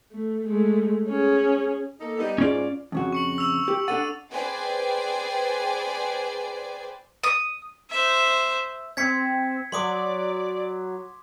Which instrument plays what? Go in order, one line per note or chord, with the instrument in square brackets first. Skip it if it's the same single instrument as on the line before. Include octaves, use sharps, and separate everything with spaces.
[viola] A3
G#3 A3
C#4 G#4
[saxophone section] A#3 D#4 A4
G3 B3 D#4
[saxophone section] G#2 [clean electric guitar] C#4 F4 D5
[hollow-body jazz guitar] F2 C#3 F#4
[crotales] C#6 C#7 F#7
E6 F7
[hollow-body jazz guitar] G4
[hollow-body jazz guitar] D4 A4 F#5 [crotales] A6 D#7
[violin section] G#4 B4 C5 D5 G5 G#5
[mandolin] D#6
[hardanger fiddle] C5 E5
[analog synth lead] C4 [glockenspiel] G#6 B6 C#7
[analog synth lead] F#3 [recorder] D5 [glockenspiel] C6 D6 D#6